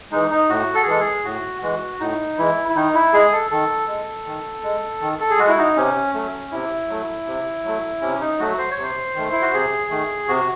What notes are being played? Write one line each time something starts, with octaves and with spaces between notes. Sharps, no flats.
E3 G#3 D#4
D#4
A2 F#4
A4
G#4
E3 G#3 A4
G#4
A2 F#4
E3 G#3 F#4
A2 D#4
E3 G#3 E4
E4
D#3 D#4
E4
G#3 G#4
A4
D#3 A4
G#3
D#3
G#3
D#3
A4
G#4
G#3 F#4
E4
D#4
C3 C#4
F#3 A3
C3 E4
F#3 A3
C3
F#3 A3
C3 C#4
D#4
F#3 A3 F#4
C5
C#5
C3
C5
D#3 A3
E4
F#4
C3 G#4
D#3 A3
C3 F#4